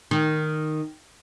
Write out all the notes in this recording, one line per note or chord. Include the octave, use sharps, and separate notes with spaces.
D#3